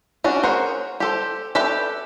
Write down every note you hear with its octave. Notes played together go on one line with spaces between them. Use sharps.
C#4 D4 F#4 D5
G#4 A#4 C5 C#5 F#5
G4 A4 C5
G4 A4 B4 D5 E5